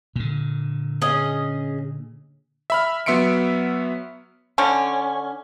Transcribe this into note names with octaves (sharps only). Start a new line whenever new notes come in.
A#2 D3
C#4 G#4 D#5
E5 B5 F6
F#3 B3 E5 C6 C#7 D7
D3 C#4